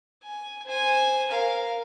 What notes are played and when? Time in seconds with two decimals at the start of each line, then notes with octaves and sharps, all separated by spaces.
0.24 G#5
0.66 C5 G#5
1.28 A#4 F5